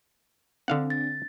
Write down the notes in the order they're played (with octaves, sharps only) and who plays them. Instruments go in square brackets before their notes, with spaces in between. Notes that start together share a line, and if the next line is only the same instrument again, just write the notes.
[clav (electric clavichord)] D3 F5 F#5 [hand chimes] C4 D4
[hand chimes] A6